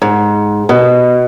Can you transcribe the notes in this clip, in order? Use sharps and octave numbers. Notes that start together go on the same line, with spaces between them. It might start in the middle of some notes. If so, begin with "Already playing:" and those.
G#2
B2